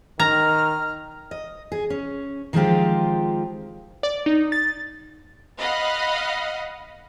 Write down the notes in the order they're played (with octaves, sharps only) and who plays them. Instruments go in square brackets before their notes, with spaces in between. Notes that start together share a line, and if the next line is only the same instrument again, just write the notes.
[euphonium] D#3 [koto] A#5 [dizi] F6
[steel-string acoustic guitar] D#5
G#4
C#4
D#3 F3 G#3 C4 F4 G4
[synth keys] D5
D#4
A6
[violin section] D#5 F5 F#5 B5